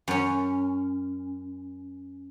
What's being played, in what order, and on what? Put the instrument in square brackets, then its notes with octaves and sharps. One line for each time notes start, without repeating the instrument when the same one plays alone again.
[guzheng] F#2 C#4